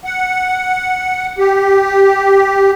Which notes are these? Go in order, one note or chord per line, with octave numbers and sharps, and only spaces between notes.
F#5
G4